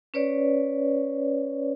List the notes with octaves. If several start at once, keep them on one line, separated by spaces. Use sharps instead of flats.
C#4 B4 C#5 D5